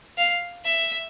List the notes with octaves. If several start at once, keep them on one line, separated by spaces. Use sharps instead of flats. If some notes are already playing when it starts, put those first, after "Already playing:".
F5
E5